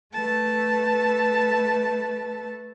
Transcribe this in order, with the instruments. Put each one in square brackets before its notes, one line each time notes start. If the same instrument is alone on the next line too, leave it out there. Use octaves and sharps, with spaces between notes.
[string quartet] A3 B4 A5